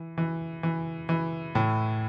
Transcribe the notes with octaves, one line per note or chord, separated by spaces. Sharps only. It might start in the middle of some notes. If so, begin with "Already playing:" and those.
Already playing: E3
E3
E3
E3
A2